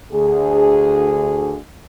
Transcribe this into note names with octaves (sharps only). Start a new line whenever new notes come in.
D2 G#4